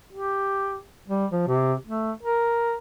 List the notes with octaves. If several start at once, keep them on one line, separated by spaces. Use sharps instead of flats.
G4
G3
F3
C3
A3
A#4